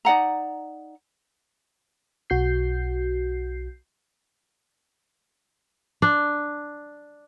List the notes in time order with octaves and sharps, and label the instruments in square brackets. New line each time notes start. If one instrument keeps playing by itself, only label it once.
[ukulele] D#4 D5 F#5 A#5
[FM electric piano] B1 F#4 G6 C7
[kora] D4